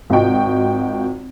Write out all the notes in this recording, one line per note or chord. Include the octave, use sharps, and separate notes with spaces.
G#1 F4 F#4 D#5 G5 C#6